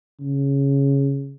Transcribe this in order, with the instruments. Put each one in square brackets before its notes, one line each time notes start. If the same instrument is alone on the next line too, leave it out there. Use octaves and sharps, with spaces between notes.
[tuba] C#3